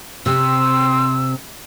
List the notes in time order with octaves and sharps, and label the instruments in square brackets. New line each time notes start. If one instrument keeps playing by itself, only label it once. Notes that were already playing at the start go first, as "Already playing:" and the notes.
[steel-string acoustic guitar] C3 [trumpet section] C4 [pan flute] E6